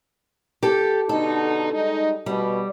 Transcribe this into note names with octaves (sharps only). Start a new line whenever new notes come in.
G4 A4
B2 D3 D#4 A4
G3 G#3 D#4
B2 G3